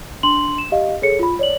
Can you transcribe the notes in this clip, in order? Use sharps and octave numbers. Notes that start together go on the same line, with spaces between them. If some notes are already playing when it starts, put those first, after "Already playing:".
D4 C6 F#7
E7
G4 D#5 F5
G#4 A4 C#5 C#7
F4 B5
C#5 D5 F#7